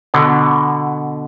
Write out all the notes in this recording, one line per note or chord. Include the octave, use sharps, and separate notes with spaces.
B2 D3